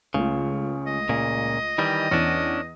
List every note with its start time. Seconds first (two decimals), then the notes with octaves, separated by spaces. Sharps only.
0.14 C#2 C#3 A3
0.87 D#5
1.09 A#2 C#3
1.78 D#3 E3 G3
2.11 E2 C#4 D4 A#6 D#7